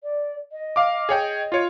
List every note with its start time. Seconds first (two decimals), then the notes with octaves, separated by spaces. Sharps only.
0.03 D5
0.52 D#5
0.76 F5 D6
1.09 G#4 C#5 G5
1.52 F4 C#5